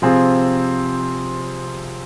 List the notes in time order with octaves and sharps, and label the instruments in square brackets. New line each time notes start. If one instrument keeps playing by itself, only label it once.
[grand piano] C3 F3 C4 F4 G#4